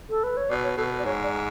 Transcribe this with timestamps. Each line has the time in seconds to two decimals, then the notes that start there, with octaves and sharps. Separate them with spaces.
0.10 A4
0.24 B4
0.37 C#5
0.50 B2 D5
0.64 C#5
0.77 B2 A4
0.91 B4
0.98 D5
1.05 G#2 C#5
1.23 D5